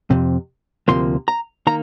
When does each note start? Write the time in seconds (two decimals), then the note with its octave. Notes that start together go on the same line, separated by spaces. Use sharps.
0.11 F2 C3
0.88 D2 C3 F3 A#3 C6
1.28 A#5
1.67 D#3 A#3 A#5